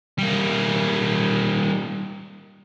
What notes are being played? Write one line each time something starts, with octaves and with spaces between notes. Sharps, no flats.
G3 A#3